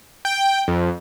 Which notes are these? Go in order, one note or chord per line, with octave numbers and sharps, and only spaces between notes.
G5
F2